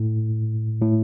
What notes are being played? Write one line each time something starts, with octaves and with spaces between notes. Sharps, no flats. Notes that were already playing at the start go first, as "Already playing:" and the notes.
Already playing: A2
A2